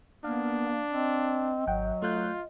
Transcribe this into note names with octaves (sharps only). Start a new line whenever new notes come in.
A#3 B3 D4 F5
C4 D#5
G#1 F#3 F#5 G5
A3 F4 F#6 G6